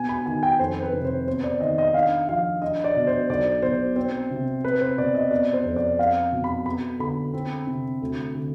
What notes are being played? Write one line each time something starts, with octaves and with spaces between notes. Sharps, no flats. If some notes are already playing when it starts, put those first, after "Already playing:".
Already playing: B2 B3 G#5
B5
D#3 G#5
G5
F2 C5
B4
C3
C5
B3 C5
D5
D#3 D#5
D#5
D4 F5
F3 F5
D4 D#5
D5
B2
C5
B1 D5
B2 C5
C4 C5
C3
C4 B4
C5
B2 D5
D#5
B3 D5
C5
F2
D5
C4 F5
B2
B5
B3 B5
D3 B5
C4
C3
D2
D3